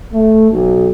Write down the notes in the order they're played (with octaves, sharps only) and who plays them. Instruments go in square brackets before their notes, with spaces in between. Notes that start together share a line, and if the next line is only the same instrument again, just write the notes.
[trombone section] A3
B1